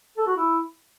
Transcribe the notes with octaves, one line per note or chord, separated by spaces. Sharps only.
A4
F#4
E4